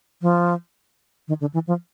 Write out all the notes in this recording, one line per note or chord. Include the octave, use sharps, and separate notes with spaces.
F3
D#3
D3
E3
F3